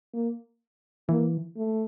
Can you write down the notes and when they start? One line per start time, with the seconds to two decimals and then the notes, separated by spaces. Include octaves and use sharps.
0.14 A#3
1.09 E3 A#3
1.56 A3